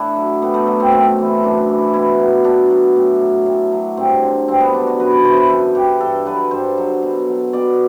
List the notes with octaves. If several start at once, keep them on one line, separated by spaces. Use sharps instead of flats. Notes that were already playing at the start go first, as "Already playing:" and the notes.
Already playing: A2 D4 E4
F#3
A2 B3
A3
F#3
C4
F#2 C4
E3
F#2 D4
E3
B2 E4
F#3
B2 D4
F#3
A2
F#3
A2
F#3
G2 C4
D3 F#3
G2 C4
B3
D3 F#3 D4
F#4
F#2 B4
B4
E3 C5
B4
F#2 A4
E3 G4
G2 A4
F#3 B4
G2 C5
F#3
B2
F#3
B2 D5